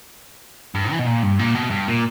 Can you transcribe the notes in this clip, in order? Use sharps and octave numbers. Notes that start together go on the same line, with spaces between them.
G2
E3
B2
A#2
G2
A#2
B2
G2
A#2